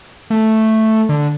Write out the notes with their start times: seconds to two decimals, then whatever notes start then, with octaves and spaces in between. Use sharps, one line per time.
0.30 A3
1.09 D3